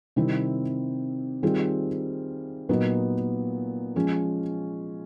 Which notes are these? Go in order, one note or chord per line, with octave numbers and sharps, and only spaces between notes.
C3 D#3 G3 C4 E4
D#3 G3 C4 F4 G#4
A#2 F#3 B3 D#4
F3 G#3 C#4